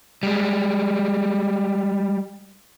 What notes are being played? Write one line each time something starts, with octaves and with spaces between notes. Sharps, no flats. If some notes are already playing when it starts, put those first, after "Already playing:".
G3 G#3